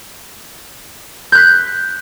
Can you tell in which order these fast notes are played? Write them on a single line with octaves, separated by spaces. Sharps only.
G6 F#6 B6